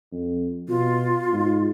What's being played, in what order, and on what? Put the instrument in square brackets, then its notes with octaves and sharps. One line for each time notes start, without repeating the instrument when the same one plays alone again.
[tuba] F2
[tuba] B2 [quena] F4
[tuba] G#2